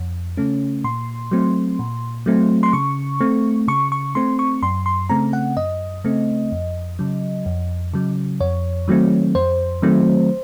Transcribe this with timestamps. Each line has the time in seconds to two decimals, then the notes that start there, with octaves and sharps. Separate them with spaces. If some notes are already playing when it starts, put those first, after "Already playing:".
Already playing: F2
0.37 C#3 A3 C#4
0.84 A#2 C6
1.31 F#3 A3 C4
1.79 A#2
2.26 F#3 A3 C4
2.63 C6
2.73 C#3 C#6
3.21 A3 C4
3.68 C#3 C#6
3.92 C#6
4.15 A3 C4 C6
4.39 C#6
4.63 F#2 C6
4.86 C6
5.09 C#3 A3 C4 A#5
5.33 F#5
5.57 F#2 D#5
6.04 C#3 A3 C4
6.52 F2
6.99 C#3 F#3
7.46 F2
7.94 C#3 F#3
8.40 F2 C#5
8.88 D#3 F#3 A3 C4
9.35 F2 C5
9.82 D#3 F#3 A3 C4